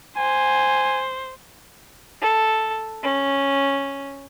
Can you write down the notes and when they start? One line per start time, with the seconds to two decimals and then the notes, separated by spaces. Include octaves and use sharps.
0.17 C5 G#5
2.21 A4
3.02 C#4